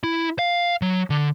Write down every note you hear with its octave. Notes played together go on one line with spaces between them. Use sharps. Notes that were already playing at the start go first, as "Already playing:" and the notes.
E4
F5
F#3
D3